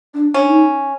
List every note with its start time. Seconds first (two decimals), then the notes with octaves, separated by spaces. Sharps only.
0.14 D4
0.34 C#4 D4
0.46 D#4